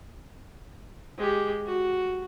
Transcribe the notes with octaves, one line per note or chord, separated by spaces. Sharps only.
G#3 G4
F#4